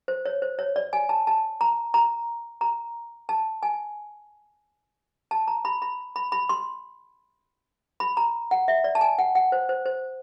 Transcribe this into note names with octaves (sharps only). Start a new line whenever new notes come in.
C5
C#5
C5
C#5
D5
G#5
A5
A5
A#5
A#5
A#5
A5
G#5
A5
A#5
B5
B5
B5
B5
C6
B5
A#5
F#5
E5
D5
A5
G#5
F#5
F#5
C5
C5
C5